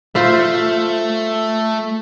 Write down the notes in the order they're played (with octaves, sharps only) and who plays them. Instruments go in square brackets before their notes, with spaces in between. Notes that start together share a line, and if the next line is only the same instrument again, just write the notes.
[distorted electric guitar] A3 [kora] F4 C5 E5